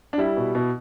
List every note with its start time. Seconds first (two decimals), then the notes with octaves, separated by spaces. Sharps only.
0.13 D4
0.18 G3 E4
0.37 B2
0.55 B2